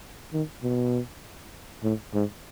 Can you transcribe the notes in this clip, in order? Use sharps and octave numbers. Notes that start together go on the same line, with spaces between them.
D#3
B2
A2
G#2